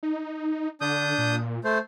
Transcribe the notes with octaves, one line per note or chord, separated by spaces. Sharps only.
D#4
D3 D4 D#6 G6
A#2
A3 C5